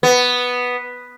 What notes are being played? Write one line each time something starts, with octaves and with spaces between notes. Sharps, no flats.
B3